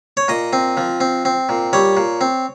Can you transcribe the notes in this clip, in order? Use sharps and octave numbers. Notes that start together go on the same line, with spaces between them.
C#5
A#2 D#5
C4
F3
C4
C4
A#2
G3 C#5
A#2
C4